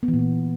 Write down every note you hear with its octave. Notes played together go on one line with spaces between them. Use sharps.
B3
E3
A#2
E3